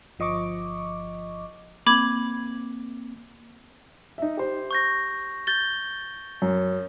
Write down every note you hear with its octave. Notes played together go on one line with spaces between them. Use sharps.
G1 F3 D#5 C#6 D6
A#3 C4 B5 D6 G#6
D#4 E5
G4 C5
C#6 G6 A#6
G6 A6 G7
F#2